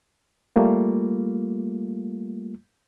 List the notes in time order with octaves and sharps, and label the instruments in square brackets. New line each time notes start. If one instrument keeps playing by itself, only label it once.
[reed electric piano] G3 A3 A#3 F4